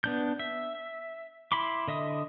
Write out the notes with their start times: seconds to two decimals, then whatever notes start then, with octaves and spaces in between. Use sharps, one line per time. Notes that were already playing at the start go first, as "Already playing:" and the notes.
0.04 B3 D4 G6
0.39 E5
1.52 E4 B5 C6 D6
1.88 D3 D#5 E5 D#6